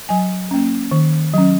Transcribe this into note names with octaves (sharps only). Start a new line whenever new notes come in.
F#3 G#5
A#3 C#4
D#3
F#3 C#4